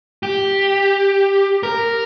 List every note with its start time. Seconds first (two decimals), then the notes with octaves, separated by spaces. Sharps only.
0.23 G4
1.63 A#4